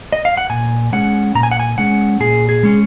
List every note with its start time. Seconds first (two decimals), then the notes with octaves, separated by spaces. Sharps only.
0.13 D#5
0.25 F5
0.37 F#5
0.50 A#2 G#5
0.93 G#3 C#4 F#5
1.35 A#2 A#5
1.43 G#5
1.51 F#5
1.59 G#5
1.78 G#3 C#4 F#5
2.20 A#2 G#4
2.49 G#4
2.63 G#3 C#4